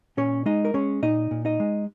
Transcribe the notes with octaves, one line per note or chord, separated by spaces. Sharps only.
A#2 C#4 C#5
G#3 D#4 D#5
A#4
G#3 C#4 C#5
A#2 D#4 D#5
A#2
D#4 D#5
G#3